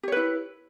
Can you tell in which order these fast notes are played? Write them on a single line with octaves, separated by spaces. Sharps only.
G4 C#5 B4 E4